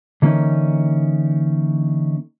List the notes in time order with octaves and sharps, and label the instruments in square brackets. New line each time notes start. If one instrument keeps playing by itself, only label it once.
[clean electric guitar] D3 E3 A#3 C#4 D#4